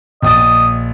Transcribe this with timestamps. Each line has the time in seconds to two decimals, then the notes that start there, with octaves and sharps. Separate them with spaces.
0.23 A#1 D#5 D#6 A6